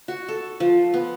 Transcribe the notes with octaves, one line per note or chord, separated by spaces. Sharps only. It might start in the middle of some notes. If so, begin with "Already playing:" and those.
F#4
A4
F3
B3